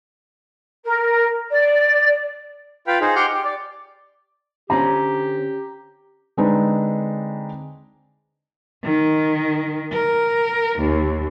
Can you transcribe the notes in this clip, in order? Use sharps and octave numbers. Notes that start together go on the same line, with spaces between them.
A#4
D5
F4 B4 F5 G5 B5
D#4 G#4 C5
G4 F#5 C6 F6 G6
G4
D5
D3 C4 C#4 G4 A#5
D3 G#3 C4 D4 D#4 B4
D#3
A#4
D#2